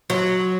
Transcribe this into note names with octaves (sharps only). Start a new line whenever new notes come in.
F#3